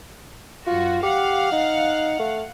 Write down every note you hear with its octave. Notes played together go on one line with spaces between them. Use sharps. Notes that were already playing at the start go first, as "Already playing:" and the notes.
F#2 F4 F#4
G4 F5 F#5
D#4
A3